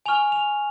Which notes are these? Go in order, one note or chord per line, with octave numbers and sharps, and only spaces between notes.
G#5 C#6 F6 F7
F7